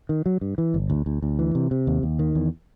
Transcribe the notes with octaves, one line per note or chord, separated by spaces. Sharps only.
D#3
F#3
G2
E3
G1
D2
D2
D2
E3
C3
C3
D#2
D#2
D#3
E2